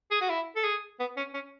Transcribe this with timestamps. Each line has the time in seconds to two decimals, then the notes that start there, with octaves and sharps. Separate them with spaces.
0.11 G#4
0.21 F#4
0.29 E4
0.56 A4
0.64 G#4
1.00 B3
1.17 C#4
1.34 C#4